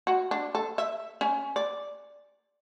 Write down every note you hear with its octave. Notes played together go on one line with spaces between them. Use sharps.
F#4
D4
A4
E5
C#4
D5